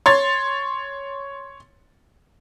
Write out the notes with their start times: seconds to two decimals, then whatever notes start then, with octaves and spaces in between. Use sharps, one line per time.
0.06 C#5 C6 A6